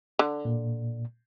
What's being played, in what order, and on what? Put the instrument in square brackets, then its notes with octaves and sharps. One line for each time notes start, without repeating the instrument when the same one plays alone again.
[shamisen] D3
[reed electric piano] A#2